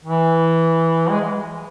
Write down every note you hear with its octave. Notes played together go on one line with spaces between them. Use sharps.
E3
G#3